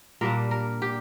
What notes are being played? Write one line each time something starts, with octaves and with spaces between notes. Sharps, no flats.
A#2 G3 A#3 D4 A#4
A#4
G4